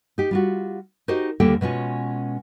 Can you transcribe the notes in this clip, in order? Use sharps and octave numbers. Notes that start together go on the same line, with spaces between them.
D#4 G4
G3 F4 F#4
D#4 F#4 G4 A#4 C5 D#5
D#2 D3 G3 A#3 A4 G5
B2 G#3 C#4 F4